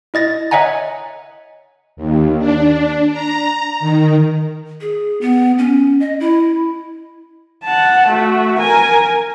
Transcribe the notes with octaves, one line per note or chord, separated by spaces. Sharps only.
E4 D#5 A6 A#6
C#5 D#5 E5 F#5 G#5 A#5
D#2
D4
A#5
D#3
G#4
B3
C#4
D#5
E4
F#5 A5
A3 F#4
A#4 G#5